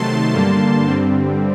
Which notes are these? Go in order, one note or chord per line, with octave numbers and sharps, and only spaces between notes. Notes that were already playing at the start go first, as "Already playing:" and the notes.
Already playing: C3 D#3 F#3 A3 A5 C6
G2 D3 G3 A#3
G2 D3 G3 C4